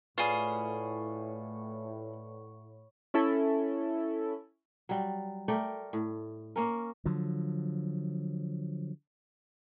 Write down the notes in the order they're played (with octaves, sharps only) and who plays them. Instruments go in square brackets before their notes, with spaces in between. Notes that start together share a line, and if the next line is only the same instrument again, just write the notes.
[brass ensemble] A2 [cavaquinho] F4 G#4 [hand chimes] B4 D5 [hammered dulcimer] C#5 F#5 B5
[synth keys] C#4 E4 A4
[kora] F#3 G3
A3 A#4 D5 G5
A2
A#3 C#4 A#4
[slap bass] D3 F3 F#3